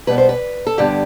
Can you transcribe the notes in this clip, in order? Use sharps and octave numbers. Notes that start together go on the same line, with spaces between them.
B2 G3 B3 B4
C5
B4
A4
G2 D3 G3 B3 G4